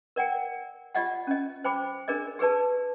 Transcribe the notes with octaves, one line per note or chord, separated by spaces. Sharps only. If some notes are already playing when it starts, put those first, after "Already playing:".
A#4 D5 F#5 G5
F4 G4 D5 D#5 F5 F#5
C#4 D#5
C5 G5 B5 D6
D4 G#4 A#4 D5 D#5
G4 G#4 B4 D5 A5